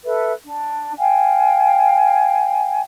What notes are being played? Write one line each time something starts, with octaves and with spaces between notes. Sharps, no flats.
A4 B4 E5
D4
F5 G5 G#5